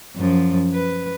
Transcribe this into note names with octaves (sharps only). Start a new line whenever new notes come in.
F#2 F3
B4